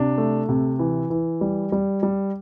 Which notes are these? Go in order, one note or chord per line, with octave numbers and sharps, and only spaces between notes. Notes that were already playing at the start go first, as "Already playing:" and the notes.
Already playing: C3 D4
A3
C3
E3
E3
G3
G3
G3